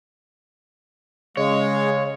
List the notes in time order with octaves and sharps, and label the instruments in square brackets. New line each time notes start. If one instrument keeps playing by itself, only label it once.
[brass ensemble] C#3 F5 [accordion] G#3 [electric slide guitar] C#5